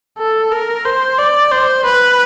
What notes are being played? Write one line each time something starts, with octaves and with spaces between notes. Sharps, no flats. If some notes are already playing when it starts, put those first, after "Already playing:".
A4
A#4
C5
D5
C5
B4